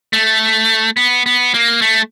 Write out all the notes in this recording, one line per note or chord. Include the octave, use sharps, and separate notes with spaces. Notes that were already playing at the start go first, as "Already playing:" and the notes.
A3
B3
B3
A#3
A3